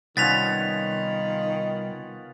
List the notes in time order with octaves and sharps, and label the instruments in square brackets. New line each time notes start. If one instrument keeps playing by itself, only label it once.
[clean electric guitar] C2 [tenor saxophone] D#3 [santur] B3 C#4 F4 [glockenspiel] A6 B6 F7